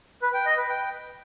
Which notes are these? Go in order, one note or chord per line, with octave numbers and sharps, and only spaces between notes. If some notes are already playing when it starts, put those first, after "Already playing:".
B4
G5
D#5
B4
G5